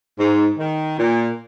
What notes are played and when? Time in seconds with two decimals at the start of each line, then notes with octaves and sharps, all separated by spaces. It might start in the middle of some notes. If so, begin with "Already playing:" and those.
0.19 G#2
0.58 D#3
0.99 A#2